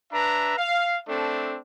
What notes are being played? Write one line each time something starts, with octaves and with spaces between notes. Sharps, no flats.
D4 B4 E5 A#5
F5
A3 C4 D4 A4